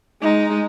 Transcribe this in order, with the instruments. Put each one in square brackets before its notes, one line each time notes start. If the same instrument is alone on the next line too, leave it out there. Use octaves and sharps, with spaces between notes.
[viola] G#3 [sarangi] D#4